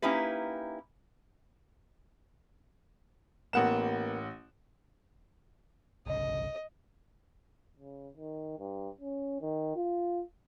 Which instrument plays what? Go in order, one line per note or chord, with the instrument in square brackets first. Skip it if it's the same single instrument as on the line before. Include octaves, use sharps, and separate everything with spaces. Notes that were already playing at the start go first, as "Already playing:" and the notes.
[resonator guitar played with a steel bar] A#3 C#4 D#4 E4 G4 B4
[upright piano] A1 F#5 E7 [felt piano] A#3 B3 A#4
[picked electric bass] G1 C2 C#3 [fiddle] D#5
[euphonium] C#3
D#3
G2
C#4
D#3
F4